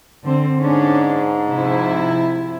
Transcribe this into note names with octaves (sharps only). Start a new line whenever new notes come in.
D3 C4
G#2 C#4 D4
C3 F3 E4